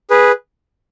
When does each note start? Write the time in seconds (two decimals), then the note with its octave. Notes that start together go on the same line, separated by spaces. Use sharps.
0.10 G#4 B4